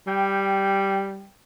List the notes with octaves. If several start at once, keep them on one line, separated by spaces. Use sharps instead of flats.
G3 G5